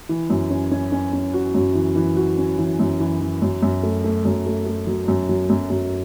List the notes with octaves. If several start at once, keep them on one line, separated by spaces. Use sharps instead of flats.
E3
F#2
C#4
C#4
C#4
C#4
F#4
F#2
E3
E3
F#4
C#4
E3
F#2
E3
E3
F#2
F#2
A3
A3
F#2
A3
A3
F#3
F#2
F#3
F#2
F#2